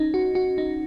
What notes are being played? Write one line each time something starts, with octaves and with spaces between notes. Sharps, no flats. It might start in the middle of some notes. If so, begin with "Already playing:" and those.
Already playing: C#4 D#4
F#4
F#4
D#4